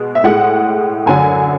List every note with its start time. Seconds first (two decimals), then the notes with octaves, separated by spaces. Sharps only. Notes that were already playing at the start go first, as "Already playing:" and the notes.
Already playing: B2 G#3
0.15 E5
0.24 A2 G#3 F#5
1.06 F#2 D3 F#3 G#5